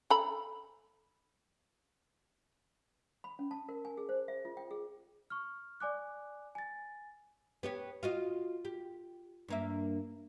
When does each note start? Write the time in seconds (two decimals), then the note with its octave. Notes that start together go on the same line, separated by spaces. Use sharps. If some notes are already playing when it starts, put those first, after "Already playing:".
0.10 A4 A#5 B5
3.24 B5
3.39 C#4
3.51 A5
3.69 A#4
3.85 G#5
3.97 G#4
4.09 C5
4.28 E5
4.45 F4
4.57 G5
4.71 G#4
5.30 C#6 F6
5.80 D5 G#5 D6 F#6
6.55 G#5 A6
7.63 B3 G4 C#5
8.03 F4 F#4 D#5
8.65 G4
9.48 G2 A#3 E5